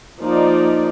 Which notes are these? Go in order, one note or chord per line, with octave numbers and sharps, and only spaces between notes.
F3 A#3 D#4 D5